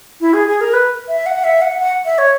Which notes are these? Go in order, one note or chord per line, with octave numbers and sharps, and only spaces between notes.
E4
G#4
G#4
A#4
B4
E5
F#5
E5
F#5
F#5
E5
C#5